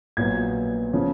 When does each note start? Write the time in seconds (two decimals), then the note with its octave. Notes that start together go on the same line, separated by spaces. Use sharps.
0.17 A#1 A#2 F#3 B3 G#6
0.93 C#3 F3